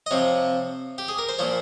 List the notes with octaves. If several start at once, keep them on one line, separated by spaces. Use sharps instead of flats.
D#5
C3 F3 C#5
G4
G#4
A#4
C5
A#2 F3 C#5